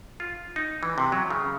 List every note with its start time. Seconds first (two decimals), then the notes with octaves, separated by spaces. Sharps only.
0.20 F4
0.56 D#4
0.83 E3
0.98 C3
1.12 F#3
1.30 C#3